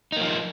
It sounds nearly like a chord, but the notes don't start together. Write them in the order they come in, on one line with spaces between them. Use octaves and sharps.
D#4 A#3 F3